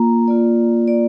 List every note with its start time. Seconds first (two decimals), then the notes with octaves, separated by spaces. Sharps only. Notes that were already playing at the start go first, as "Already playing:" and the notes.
Already playing: A#3 F4 A#5
0.28 A#3 F4 D5
0.88 D5